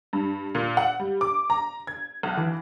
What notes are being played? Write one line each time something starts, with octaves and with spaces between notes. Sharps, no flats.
G2
A#2
F#5
G3
D6
A#5
G#6
B1
E3